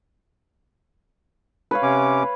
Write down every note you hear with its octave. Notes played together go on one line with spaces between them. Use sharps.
B4 C#5 F5
C3 C#4 D6